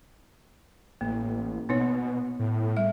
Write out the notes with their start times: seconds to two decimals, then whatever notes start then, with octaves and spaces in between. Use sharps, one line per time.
1.01 A1 A#3
1.69 B2 B3 D#4 C#5
2.39 A2
2.77 G3 E5